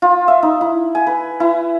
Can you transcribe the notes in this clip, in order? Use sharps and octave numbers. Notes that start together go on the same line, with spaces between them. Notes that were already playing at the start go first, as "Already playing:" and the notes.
F4
E5
D#4
E4
G#5
B4
E4